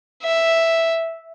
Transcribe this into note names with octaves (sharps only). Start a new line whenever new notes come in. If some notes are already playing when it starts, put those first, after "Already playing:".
E5